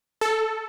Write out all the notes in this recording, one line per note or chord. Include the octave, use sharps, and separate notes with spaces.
A4